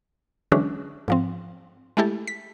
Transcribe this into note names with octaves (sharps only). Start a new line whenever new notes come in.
D3 E3 F#3 G#3 C#4 D4
G#2 F3 C4
G#3 A3 E4 G4 A4
B6